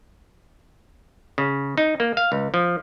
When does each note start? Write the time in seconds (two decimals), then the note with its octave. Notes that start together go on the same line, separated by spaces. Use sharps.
1.38 C#3
1.78 D#4
2.00 A#3
2.17 F5
2.32 C#2
2.54 F3